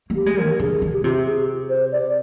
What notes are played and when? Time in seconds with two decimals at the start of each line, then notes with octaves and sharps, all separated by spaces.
0.10 A#3
0.15 G4
0.26 G#3
0.37 A#4
0.43 D3
0.60 D3 G#4
0.82 D3
0.93 G4
1.03 C3 F4
1.13 G4
1.25 G#4
1.70 C5
1.92 D5